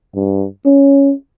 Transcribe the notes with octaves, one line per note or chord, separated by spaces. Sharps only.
G2
C#4